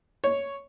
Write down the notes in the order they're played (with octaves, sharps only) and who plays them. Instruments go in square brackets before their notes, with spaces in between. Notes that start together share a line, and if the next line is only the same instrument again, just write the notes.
[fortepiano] C#5